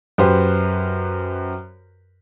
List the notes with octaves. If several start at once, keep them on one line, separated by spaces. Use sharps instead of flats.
F#2 G4 B4 C5